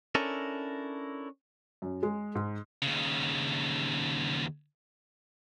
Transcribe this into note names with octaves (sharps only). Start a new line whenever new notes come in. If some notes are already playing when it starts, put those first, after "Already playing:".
C#4 D4 E4 A4 A#4
F#2
G#3
G#2
D#2 C#3